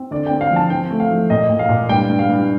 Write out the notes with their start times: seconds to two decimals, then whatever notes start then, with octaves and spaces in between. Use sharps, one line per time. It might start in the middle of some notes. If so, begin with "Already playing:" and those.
Already playing: C4
0.11 D3 D5
0.26 C4 G5
0.41 F5
0.51 F3
0.56 A5
0.70 C4 G5
0.90 A3
1.00 F5
1.10 F3
1.30 A#2 D#5
1.50 A#2
1.59 F5
1.69 A#2
1.89 G2 G5
2.09 G2
2.19 F5
2.29 G2